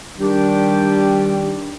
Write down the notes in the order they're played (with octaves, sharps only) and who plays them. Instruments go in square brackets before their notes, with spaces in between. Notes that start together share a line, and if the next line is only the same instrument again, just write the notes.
[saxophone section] D#3 G3 D4 G4